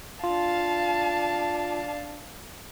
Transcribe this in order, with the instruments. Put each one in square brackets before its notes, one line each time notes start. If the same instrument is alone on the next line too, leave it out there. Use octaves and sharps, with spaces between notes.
[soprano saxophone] D4 [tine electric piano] F4 [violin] F5 A5